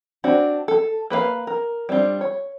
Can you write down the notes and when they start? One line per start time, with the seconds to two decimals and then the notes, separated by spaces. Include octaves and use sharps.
0.24 C4 D4 F#4
0.68 A4
1.10 A#3 B4 C5 F5
1.47 A#4
1.89 G3 C4 D4 F4
2.21 C#5